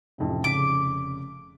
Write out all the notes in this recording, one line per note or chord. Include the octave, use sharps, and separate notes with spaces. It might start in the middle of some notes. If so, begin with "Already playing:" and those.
A1 F2 C3
F1 C#3 D6 B6